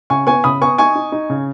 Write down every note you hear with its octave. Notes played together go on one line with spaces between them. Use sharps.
C#3 G#5 C#6
B3 G#5 C#6
C#3 B5 D#6
B3 G#5 C#6
D#4 G#5 C#6
D#4
D#4
C#3